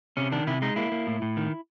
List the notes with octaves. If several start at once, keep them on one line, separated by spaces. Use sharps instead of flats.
C3 C#4
D#3 D4
C3 E4
G#3 D#4
A#3 E4
A#3
A2
A2
D#3